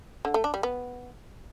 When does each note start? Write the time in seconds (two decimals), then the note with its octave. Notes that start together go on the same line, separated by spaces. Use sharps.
0.25 D3
0.34 A3
0.44 D4
0.54 G3
0.63 B3